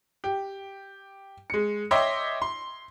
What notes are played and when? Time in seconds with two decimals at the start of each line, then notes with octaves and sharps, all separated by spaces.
0.24 G4
1.50 G#3 C#7
1.91 C#5 D#5 E5 G5 C6 D6
2.42 C6